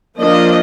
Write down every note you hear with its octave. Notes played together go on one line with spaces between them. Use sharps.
F3 A#3 D4 D#5